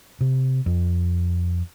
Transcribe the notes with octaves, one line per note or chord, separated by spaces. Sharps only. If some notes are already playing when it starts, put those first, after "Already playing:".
C3
F2